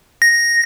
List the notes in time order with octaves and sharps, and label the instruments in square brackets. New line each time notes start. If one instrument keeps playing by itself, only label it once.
[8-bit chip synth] A#6